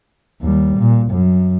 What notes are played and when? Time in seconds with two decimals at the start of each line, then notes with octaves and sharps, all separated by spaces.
0.42 D#2 G3
0.78 A#2
1.11 F#2